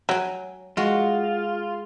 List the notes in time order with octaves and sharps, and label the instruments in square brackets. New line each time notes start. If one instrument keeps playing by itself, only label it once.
[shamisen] F#3 [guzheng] G5 G#5
[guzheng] G#3 F#4 [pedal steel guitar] F4